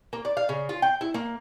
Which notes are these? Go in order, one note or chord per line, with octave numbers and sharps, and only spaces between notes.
A#3
D5
F5
C#3
F4
G5
E4
A#3